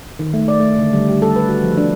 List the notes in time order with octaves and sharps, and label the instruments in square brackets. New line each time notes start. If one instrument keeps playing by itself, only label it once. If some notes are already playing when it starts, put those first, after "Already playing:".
[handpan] D#3
A3
D5
A3
D3
G3
G4
A4
B4
F#4
F3
D4